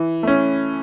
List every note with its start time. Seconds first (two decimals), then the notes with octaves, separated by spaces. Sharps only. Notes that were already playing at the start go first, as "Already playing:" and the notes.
Already playing: E3
0.23 A3 C#4